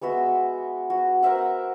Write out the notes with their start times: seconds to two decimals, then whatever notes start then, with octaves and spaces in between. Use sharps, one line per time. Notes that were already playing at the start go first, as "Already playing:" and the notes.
0.01 G#3 B3 F#4 E5
0.90 F#4
1.23 A#4 C5 E5 F#5